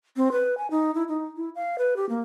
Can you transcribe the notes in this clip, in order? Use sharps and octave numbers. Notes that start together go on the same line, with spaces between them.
C4
B4
G#5
D#4
E4
D#4
E4
F5
B4
G4
A#3